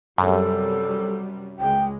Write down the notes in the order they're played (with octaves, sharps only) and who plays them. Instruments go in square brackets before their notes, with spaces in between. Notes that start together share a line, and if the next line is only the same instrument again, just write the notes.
[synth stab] F#2 [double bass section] C3 F#3 G3 [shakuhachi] A4
[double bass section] C#2 G#3 [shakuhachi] G5